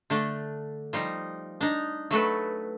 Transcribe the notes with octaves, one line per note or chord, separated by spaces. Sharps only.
D3 A3 D4
F3 G3 D#4
D4 D#4
F#3 A3 A4 B4